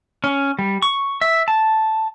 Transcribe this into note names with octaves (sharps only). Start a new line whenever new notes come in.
C#4
G3
C#6
E5
A5